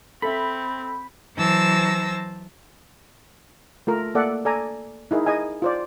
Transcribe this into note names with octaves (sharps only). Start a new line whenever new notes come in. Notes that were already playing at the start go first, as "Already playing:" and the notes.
C4 A4 E5 B5
E3 F#3 C5 A5 E6 A#6
A3 F4 A#4
A#3 A4 D5 E5 F#5
A4 D5 G#5 A#5
D#4 E4 G#4 A#4
G#4 D#5 G#5
F4 C5 D5